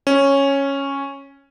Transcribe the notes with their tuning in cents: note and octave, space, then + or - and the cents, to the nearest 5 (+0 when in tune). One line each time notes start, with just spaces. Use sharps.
C#4 -5